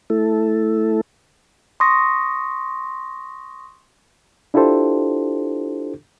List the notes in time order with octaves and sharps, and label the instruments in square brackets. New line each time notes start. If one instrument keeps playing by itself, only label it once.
[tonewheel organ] A3 E4 A4
[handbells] C6 C#6 D#6 A#6
[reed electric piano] D4 E4 F4 G4 A4 C5